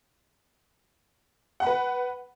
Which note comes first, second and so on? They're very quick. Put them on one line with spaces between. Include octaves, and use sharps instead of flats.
F#5 B5 B4